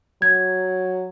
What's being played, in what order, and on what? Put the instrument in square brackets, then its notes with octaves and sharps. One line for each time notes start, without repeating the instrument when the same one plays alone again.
[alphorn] F#3 [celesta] G#6